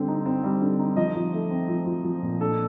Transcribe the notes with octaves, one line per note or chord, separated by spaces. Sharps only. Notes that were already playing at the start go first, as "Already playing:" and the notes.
Already playing: D3 G3 C4
D#4
C4
G3
D3
D#4
F3 D#5
F3
A3
C4
F3
F3
F3
A#2
D4 A4